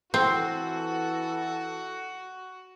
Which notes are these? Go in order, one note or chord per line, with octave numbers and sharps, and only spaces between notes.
E3 C4 F#4 A4